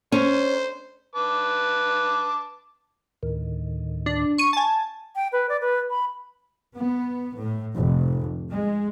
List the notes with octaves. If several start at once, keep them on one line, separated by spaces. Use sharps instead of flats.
C#4 C5
B4 A5 D6
D2 A2 D#3
D4
C#6 D#7
G#5 A5
G5
B4
D5
B4
B5
B3
A2
F1
G#3